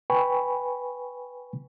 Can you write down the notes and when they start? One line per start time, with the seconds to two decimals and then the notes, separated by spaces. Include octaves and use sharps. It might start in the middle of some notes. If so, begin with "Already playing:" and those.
0.10 B4 G5 G#5 B5 C#6